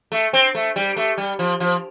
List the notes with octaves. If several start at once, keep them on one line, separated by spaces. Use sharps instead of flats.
A3
C4
A3
G3
A3
G3
F3
F3